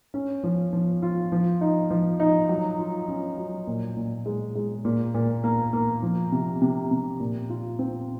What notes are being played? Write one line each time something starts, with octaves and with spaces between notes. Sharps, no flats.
C#4
F3
F3
F4
F3
D#4
F3
D#4
F#3
F4
C#4
F#3
A#2
A#2
G#3
G#3
A#2
A#2
A#3
A#3
F3
C3
C3
C3
A#2
F4
C4